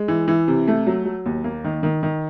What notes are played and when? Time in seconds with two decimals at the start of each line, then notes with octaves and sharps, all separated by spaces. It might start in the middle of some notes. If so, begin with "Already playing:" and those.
Already playing: G#3
0.08 E3
0.28 E3
0.48 C3
0.68 A3
0.87 F#3
1.05 F#3
1.26 D#2
1.44 A#3
1.64 D#3
1.83 D#3
2.03 D#3